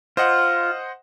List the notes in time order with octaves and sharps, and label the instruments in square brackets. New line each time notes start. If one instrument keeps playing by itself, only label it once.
[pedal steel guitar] F4 [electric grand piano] C5 D#5 F#5